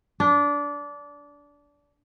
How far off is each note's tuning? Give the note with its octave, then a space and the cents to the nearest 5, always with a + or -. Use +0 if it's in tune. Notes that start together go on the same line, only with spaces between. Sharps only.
D4 -20